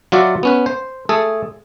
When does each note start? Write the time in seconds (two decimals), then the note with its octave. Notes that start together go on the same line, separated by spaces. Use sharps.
0.12 F#3 F4 F#4 D5 E5 F#5
0.43 B3 C#4 B4
0.66 C5
1.09 A3 G#4 A4